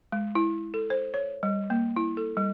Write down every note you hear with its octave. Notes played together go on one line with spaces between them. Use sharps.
G#3
E4
A4
C5
C#5
G3
A#3
E4
A4
G3